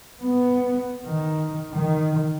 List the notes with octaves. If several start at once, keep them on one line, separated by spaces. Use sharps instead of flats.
B3
D#3
D#3